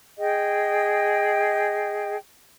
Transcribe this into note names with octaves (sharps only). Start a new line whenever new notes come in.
G#4 D#5 G5